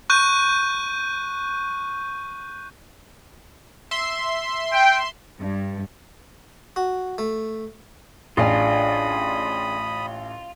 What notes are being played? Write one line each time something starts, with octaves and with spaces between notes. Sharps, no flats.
C#6 F#6 G6 D#7
E5 C6
G5
G2
F#4
A3
A1 D4 F4 G#4 B5 D#6